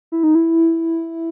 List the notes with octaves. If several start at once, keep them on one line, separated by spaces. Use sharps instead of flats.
E4
D#4
E4